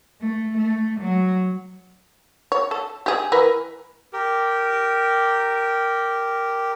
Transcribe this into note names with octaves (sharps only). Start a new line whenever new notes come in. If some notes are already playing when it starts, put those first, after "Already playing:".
A3
A3
F#3
C#5
A4
G4 G#4
E3 A#4 B4
G4 A#4